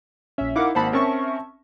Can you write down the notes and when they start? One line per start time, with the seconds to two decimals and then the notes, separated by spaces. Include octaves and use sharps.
0.38 A#1 C#4 E5
0.56 D#4 E4 A#4 F5 F#5 D6
0.75 G#1 A#3 C5 F#5 A5 B5
0.93 C4 C#4 A#4 E5 A5 C#6